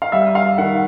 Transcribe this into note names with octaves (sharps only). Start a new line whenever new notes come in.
F5
G3 E5
F5
D#3 F#5